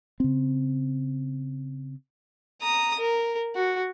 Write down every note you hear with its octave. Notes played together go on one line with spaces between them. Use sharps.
C#3 C4
A#5 D#6
A#4
F#4